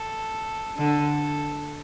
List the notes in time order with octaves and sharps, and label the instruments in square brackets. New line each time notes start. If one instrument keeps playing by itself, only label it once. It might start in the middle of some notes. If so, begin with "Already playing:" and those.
Already playing: [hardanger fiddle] A4
[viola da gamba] D3 [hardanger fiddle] A4